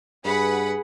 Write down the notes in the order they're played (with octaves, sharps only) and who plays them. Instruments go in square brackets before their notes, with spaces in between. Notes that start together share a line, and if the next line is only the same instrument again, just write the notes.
[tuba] G2 [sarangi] G#4 [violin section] B4 F#5 B5